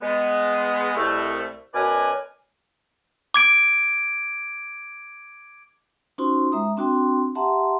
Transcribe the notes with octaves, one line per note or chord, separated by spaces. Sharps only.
G#3 B3
C2 B2 A3
F#2 B2 A#4 B4 D5 G#5
D6 G#6 D7
C#4 D#4 F4 F#4 C5 C6
G#3 E5 A#5 D#6
C4 D4 F#4 G5 C6
G4 E5 F#5 A5 A#5 C6